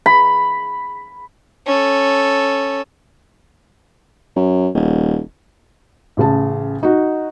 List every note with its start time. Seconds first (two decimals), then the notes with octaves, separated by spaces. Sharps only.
0.06 B5
1.66 C#4 A4
4.36 F#2
4.74 D#1
6.17 A1 C#3 A5
6.83 D#4 F#4